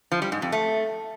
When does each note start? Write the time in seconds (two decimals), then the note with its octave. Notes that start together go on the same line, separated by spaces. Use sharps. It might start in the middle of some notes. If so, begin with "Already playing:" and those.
0.12 F3
0.22 G3
0.32 G#2
0.42 F2
0.52 A3